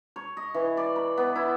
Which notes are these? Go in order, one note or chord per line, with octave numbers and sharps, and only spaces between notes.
C#5
D#5
E3
D5
B5
B3
E4